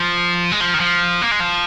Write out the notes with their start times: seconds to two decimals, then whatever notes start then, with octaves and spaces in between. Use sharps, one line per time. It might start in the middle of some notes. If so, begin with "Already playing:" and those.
Already playing: F3
0.52 G#3
0.61 F3
0.74 D#3
0.80 F3
1.22 A#3
1.31 G#3
1.40 F3